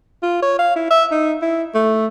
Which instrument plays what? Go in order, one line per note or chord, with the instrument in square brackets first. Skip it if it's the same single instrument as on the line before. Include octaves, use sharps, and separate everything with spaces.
[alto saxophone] F4
C#5
F5
E4
E5
D#4
E4
A3